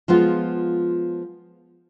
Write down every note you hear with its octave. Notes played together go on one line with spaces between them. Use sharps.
F3 G#3 B3 F4